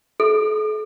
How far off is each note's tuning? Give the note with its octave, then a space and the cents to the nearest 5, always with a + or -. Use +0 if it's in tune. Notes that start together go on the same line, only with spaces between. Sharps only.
A4 -45